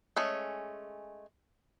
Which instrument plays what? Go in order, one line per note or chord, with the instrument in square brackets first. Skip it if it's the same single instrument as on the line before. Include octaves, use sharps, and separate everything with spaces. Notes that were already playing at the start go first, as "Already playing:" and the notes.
[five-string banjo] G#3 A3 C#4